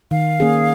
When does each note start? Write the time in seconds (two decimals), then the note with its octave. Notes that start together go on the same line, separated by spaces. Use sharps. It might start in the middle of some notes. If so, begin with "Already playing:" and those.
0.11 D#3 F5
0.40 A#3 C#4 G#4